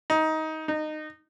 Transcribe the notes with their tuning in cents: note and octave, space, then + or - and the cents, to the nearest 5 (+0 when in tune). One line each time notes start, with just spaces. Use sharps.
D#4 +20
D#4 -20